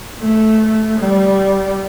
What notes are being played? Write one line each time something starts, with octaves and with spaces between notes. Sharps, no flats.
A3
G3